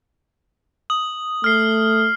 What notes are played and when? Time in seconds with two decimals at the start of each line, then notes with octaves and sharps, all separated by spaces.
0.90 D#6 F#7
1.44 A3 F6 C7